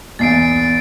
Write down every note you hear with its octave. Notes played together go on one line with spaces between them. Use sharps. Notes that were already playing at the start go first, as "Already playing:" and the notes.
B1 E2 A6 C7 D7